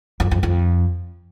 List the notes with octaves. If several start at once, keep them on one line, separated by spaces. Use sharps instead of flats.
F2
F2
F2